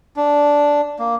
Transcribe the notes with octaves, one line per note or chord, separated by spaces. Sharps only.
D4
A#3